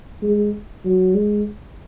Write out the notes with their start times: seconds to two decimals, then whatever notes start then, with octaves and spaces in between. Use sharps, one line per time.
0.23 G#3
0.85 F#3
1.15 G#3